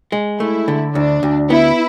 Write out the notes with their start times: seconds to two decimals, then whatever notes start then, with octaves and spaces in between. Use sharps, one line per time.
0.12 G#3
0.40 A3 E4
0.68 D3
0.95 D2 D4
1.23 D2
1.50 B3 E4